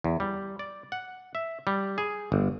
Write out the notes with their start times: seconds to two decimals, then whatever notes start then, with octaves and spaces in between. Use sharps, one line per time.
0.04 E2
0.20 G3
0.59 D5
0.92 F#5
1.35 E5
1.67 G3
1.98 G#4
2.32 G1